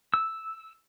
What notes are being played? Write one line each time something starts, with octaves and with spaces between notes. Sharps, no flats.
E6